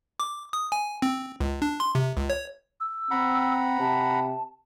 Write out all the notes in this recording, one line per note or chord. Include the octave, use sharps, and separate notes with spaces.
D6
D#6
G#5
C4
C#2
D4
C6
C3
C#2
C#5
E6
C4 F#5 A#5 B5
C3 A5